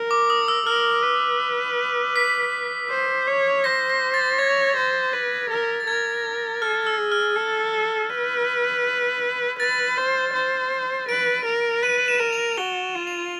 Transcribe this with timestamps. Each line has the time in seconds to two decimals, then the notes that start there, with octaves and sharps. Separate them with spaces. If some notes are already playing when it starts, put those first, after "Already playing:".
Already playing: A#4
0.11 D6
0.30 D#6
0.48 E6
0.66 A#4 F6
1.03 B4
2.16 B6
2.90 C5
3.27 C#5
3.64 C5 A#6
3.90 A#6
4.14 A6
4.39 C#5 G#6
4.76 C5
5.13 B4
5.50 A#4
5.80 A6
5.87 A#4 G#6
6.62 A4 F6
6.87 E6
6.99 G#4
7.12 F6
7.36 A4
8.10 B4
9.60 B4 A6
9.97 C5
10.34 C5
11.09 B4 D7
11.45 A#4
11.83 B4 D#7
12.08 E7
12.20 A#4
12.33 F7
12.57 F#4 G7
12.95 F4
13.07 F7